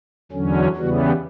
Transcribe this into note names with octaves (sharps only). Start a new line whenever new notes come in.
E2 D3 F#3 C#4
E2 C#3 E3 G3 B3 F#4